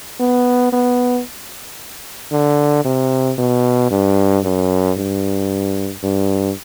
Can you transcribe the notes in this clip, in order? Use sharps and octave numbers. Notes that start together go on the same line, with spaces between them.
B3
B3
D3
C3
B2
G2
F#2
G2
G2